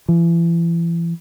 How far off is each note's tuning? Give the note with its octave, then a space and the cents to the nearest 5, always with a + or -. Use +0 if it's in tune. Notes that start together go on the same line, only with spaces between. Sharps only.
E3 +35